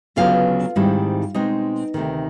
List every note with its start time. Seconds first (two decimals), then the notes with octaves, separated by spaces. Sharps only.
0.16 D2 C#3 F#3 B3 D4 F4 F5
0.76 G#2 D#3 G3 C4 E4
1.34 B2 G#3 C4 D#4 D#5
1.94 D2 C3 D#3